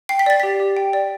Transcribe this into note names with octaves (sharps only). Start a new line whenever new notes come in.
G5 C7
B6
D5 A6
G4 B6
G4
G5
D5